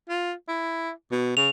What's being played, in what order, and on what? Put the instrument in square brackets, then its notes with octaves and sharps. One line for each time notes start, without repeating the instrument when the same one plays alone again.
[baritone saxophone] F4
E4
B2
[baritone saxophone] C#3 [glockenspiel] F7